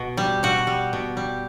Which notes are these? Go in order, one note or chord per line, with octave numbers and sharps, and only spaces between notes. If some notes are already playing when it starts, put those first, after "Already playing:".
Already playing: B2
G3
B2 F#4
G3
B2
G3